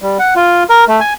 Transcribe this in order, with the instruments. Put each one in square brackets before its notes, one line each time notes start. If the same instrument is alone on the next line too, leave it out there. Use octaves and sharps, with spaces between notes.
[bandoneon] G3
F#5
F4
A#4
A3
G#5